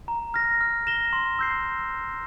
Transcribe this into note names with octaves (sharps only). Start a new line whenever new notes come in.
A#5
F6 A#6
F6
A#6 E7 G7
C6
E6 G6 C7